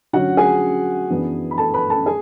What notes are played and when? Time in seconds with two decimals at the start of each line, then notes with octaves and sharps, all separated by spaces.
0.13 D3 F#3 C#4 F#4 F#5
0.37 G#4 G#5
1.10 F#2 E3 B3 D4
1.51 B5
1.58 A4 A5
1.74 B4 B5
1.90 A4 A5
2.06 G#4 G#5